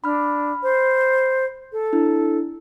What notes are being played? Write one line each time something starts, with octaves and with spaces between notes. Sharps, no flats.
D4 B5 F6
C5
A4
D4 E4